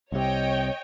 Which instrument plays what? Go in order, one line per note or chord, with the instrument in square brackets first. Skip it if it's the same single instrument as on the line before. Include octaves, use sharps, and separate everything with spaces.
[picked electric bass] C2 C3 [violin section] C#5 D#5 G5